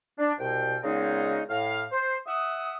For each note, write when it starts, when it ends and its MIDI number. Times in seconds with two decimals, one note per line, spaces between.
0.19 0.33 62
0.39 0.77 36
0.39 0.77 47
0.39 0.77 79
0.83 1.43 46
0.83 1.43 49
0.83 1.43 56
0.83 1.43 59
0.83 1.43 60
0.83 1.43 63
1.49 1.84 45
1.49 1.84 77
1.92 2.17 72
2.27 2.76 76
2.27 2.76 78
2.27 2.76 87